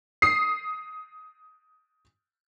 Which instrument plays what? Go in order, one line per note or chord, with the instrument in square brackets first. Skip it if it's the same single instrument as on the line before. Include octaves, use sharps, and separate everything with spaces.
[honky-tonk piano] D#6 C7